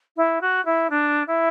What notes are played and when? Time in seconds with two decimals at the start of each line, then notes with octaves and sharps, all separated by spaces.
0.17 E4
0.41 F#4
0.65 E4
0.90 D4
1.27 E4